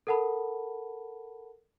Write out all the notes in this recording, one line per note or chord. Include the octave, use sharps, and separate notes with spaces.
A4 A#4 F#5 A5 B5